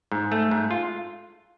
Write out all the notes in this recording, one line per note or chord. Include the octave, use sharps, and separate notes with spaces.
G#2
A3
G#2
F4